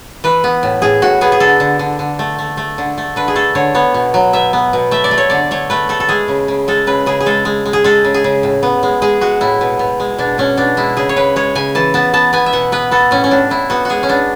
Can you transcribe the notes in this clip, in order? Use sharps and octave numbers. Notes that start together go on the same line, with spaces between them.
E3 B4
B3
A2
A2 G#4
A2 F#4
B3 G#4
G#4
D3 A4
D3
D3
D3
A3
A3
A3
D3
A3
D3 B4
G#4
A3 A4
D3 C#5
B3 C#5
B2
F#3
B2 E5
B3
B2
A3 E5
D5
A3
C#5
D3 D5
A3 C#5
A3 B4
A3 A4
A4
G#3 G#4
C#3
C#3
G#3 A4
C#3 B4
C#3 G#4
G#4
G#3 A4
G#3
G#3
G#4
G#3 A4
C#3
G#4
C#3
A2
B3
G#3
G#3 G#4
G#3 F#4
A2 E4
B2
B2
G#3
B2 D4
B2 C#4
B2 D4
G#3 E4
C#3 G#4
C#5
C#3 B4
G#3 C#5
C#3 G#5
E3 A5
B3 A5
B3 A5
B3 G#5
E5
B2 F#5
B3 B4
B3 A4
A2 C#4
C#4
A2 D4
A2 E4
B3 F#4
G#3 F#4 G#4
C#4
B3 D4